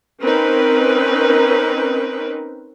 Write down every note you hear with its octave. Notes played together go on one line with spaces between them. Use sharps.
C4 C#4 D#4 A#4 B4